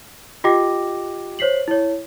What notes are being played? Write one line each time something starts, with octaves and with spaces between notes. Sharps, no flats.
F4 G4 D#5 G5 D6 A#6
C5 C#5 B6 C7 F#7
E4 C#5